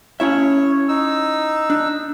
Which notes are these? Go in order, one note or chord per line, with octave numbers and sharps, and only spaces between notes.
C#4 E4 C#5 E5
D#4 E6
D4